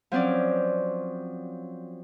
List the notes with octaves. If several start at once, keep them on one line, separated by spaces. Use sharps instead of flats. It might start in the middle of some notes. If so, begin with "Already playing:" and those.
F3 F#3 C4 C#4 D5